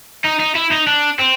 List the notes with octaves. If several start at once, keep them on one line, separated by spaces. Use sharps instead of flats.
D#4
D#4
E4
D#4
D4
C4